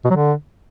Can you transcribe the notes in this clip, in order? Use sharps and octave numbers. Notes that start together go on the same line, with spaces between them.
B2
F#3
D3